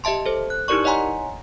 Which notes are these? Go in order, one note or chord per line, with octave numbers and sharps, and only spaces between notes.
G4 D#5 E5 A5 C6
A4 C5
F#6
D#4 E4 G4 A#4 D5 C#6
C#5 D#5 F#5 G#5 A#5 C6